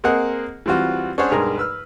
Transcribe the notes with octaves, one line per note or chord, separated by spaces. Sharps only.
A#3 C4 G#4 A#4 D#5 F#5
E3 G3 C4 F4 F#4
C#4 D4 G#4 C5 C#5 F#5
B1 G2 G#3 G#4 A#4 A#5
B4 E6 F6